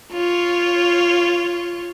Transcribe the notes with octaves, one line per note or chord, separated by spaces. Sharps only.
F4 C#5